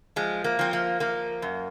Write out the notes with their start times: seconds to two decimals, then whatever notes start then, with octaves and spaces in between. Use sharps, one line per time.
0.16 F3 G#3
0.44 A#3
0.59 F3 C4
0.73 A#3
1.00 F3 A#3
1.42 F#2